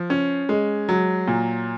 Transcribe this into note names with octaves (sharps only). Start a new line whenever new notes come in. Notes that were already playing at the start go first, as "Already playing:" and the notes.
Already playing: F3
C#4
G#3
F#3
A#2